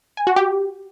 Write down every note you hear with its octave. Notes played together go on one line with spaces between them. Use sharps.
G#5
F#4
G4